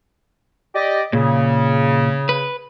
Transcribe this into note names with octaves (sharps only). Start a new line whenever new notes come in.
G4 D5 D#5
A#2 C#3
B4